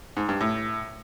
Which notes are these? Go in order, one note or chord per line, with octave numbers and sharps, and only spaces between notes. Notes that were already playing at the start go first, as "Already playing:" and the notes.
G#2
G2
A2